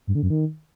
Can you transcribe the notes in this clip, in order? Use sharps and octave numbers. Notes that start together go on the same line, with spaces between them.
G2
D3
F#2
D#3